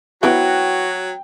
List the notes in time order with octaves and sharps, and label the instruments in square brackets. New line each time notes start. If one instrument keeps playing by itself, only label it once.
[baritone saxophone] F#3 [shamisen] B3 E4 B4 [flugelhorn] F#4 [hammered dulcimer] G5